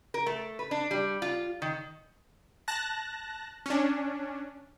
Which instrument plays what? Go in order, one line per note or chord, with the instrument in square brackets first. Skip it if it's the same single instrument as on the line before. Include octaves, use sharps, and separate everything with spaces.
[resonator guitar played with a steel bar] A#4
A3
B4
D4
G3
F4
D#3
[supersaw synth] A5 F#6 A#6
C#4 D4